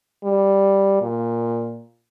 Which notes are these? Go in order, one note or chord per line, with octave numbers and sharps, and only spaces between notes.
G3
A#2